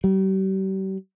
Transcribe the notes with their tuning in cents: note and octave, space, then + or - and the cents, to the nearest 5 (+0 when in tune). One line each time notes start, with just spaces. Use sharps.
G3 -40